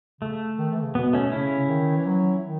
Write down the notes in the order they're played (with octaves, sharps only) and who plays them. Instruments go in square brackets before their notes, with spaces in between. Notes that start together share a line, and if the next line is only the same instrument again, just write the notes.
[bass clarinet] C#3 [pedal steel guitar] A3
[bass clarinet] D#3
E3
C#3
[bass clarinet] B2 [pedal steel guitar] B3
[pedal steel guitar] A3 C#4
[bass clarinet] C#3 [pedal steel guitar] C#4 E4
[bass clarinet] C#3
D#3
E3
F#3
D#3